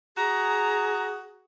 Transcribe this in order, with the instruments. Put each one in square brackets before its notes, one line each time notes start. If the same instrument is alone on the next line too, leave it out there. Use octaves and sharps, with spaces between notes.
[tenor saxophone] F#4 [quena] G#4 [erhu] A#5